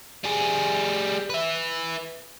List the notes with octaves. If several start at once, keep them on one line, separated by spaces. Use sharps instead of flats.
G3 G#4
B4 E5